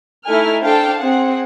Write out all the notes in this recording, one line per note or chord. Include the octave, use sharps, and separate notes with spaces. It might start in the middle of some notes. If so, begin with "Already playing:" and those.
A3 D#4 E4 A4 G#5 F6
D4 A4 C5 F5 G5 A5
C4 G#4 F#5